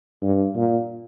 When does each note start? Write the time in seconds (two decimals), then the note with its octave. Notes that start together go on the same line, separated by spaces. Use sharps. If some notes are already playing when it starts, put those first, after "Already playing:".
0.22 G2
0.55 A#2